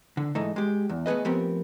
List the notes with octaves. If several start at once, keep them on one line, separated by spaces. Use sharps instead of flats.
D3
G#2 E3 A3 D#4
G#3 G4
E2
A3 B3 G#4 B4 D#5
F3 A3 B3 C4 G4 A#4